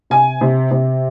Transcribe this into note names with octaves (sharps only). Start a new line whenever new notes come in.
C3 G#5
C3
C3